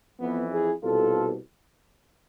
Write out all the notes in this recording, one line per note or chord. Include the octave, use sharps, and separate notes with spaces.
F2 E3 B3
E4 G#4
C2 B2 F4 A4